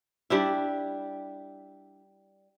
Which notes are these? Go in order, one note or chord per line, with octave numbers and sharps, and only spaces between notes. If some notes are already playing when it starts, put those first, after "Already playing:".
G3 D4 E4